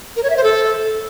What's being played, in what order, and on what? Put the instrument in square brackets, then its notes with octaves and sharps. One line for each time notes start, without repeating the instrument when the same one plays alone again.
[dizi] A#4
C#5
E5
C5
A4